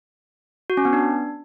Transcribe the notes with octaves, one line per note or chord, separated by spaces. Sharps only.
F#4
C#4
B3
D4